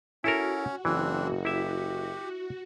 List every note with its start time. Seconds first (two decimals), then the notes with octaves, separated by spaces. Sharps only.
0.24 C#4 E4 F#4 A4 A#4
0.85 F#1 E3 C4 D4
1.45 E4 G4 E5